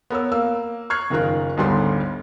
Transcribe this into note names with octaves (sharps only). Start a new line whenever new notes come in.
B3 A#4 C#5 E6
A#3 E6
C#6 F6 F#6 G#6 C7
F#1 D#3 F4 A#4 F#6
G1 D2 G#2 G3 B3 C6